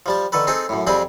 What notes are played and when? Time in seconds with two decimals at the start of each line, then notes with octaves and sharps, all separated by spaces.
0.06 F3 G3 A5
0.32 D3 D#3 A4 B4
0.47 C4 D#4 G#4 A4
0.69 F#2 A2
0.87 F2 G3 C4 D4 G#4 B5